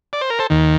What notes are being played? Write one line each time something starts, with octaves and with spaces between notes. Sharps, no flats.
D5
C5
A#4
A4 C5
D#2 D#3